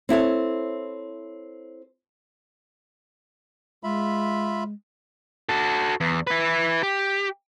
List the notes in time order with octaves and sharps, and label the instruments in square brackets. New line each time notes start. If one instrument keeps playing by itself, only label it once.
[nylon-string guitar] C4 E4 A4 C#5
[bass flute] G#3 [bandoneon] F4 E5 B5
[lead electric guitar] F#4 A4
E2
E4 B4
G4